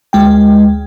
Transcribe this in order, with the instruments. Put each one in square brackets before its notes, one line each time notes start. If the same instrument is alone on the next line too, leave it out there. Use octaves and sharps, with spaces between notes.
[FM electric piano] D2 G#3 G5